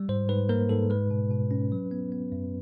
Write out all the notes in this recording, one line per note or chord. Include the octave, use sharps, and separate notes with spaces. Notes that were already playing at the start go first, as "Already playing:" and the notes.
Already playing: G3
G#2 C5
G#2 B4
A#3 A#4
G#2 A4
G#3 B4
B2
B2
C#4
F#3
B3
B3
F#2